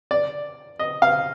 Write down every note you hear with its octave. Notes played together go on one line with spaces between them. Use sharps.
D5
D#5
F5